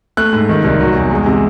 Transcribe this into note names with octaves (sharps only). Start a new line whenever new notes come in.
A3 F#6
G#2
D#3
C2
F#3
E2
G#3
C3